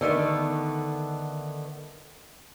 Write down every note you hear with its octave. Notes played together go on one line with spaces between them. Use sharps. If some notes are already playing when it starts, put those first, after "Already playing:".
D3 D#3 A3 B3